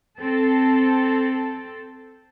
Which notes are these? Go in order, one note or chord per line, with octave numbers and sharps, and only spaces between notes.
C4 A4